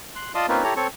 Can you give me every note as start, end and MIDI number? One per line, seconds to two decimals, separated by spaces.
0.16 0.32 84
0.16 0.32 90
0.35 0.46 65
0.35 0.46 74
0.35 0.46 75
0.35 0.46 81
0.35 0.46 84
0.35 0.46 87
0.49 0.63 58
0.49 0.63 60
0.49 0.63 61
0.49 0.63 63
0.49 0.63 65
0.49 0.63 71
0.63 0.74 64
0.63 0.74 67
0.63 0.74 69
0.63 0.74 73
0.63 0.74 82
0.76 0.87 60
0.76 0.87 69
0.76 0.87 73
0.76 0.87 85